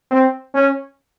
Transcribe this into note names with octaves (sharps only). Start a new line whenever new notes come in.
C4
C#4